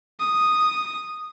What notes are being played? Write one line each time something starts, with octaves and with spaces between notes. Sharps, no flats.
D#6